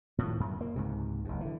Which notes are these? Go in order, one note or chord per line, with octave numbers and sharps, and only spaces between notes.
A2 D#3 F3
F#2
A#3
C#2 G#2 C3
F#1 D#2
D3 E3